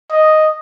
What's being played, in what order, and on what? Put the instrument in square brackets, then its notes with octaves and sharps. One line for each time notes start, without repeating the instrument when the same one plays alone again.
[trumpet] D#5